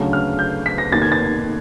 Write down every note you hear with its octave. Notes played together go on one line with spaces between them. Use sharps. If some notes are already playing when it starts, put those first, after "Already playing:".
Already playing: D2 C#3 F#3 A3 C#4
F6
G6
B6
A#6
F1 D#2 D#3 A6
G#6
A6